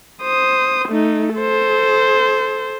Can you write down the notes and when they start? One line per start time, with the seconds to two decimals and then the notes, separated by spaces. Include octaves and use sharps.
0.23 C5 D#6
0.89 A3 D#4
1.35 A4 C5